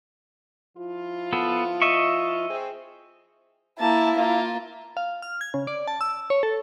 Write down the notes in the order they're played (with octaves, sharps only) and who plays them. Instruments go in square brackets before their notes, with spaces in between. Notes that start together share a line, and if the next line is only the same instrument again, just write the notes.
[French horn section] F3 E4 F4
[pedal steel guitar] B3 A4
D#5 E5 C#6
[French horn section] C4 G#4
[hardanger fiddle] A#3 A5 [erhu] E4
[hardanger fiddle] A#3 F4
[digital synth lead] F5
F6
G#6
C#3
D5
A5
E6
C#5
A4